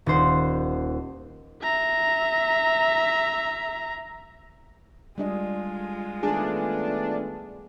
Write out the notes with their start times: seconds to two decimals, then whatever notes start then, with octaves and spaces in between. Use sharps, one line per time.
0.06 D#1 D#4 C5 F#5
1.63 E5 A#5
5.18 G3 G#3 D4 F4 D#5
6.23 D#3 A3 B3 D4 G#4